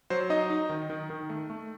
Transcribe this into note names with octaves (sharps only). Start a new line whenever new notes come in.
F#3 C5
D#4 D#5
D#4
D#3
D#3
D#3
A3
A3